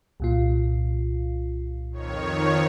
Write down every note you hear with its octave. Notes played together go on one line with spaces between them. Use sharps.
C2 A#2 F4
F2 D#3 C#5